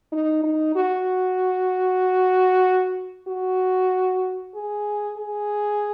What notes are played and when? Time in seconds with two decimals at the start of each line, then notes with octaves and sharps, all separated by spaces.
0.12 D#4
0.43 D#4
0.75 F#4
3.28 F#4
4.55 G#4
5.17 G#4